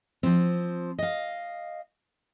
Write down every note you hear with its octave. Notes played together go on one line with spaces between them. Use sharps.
F3 C4
D#5 F5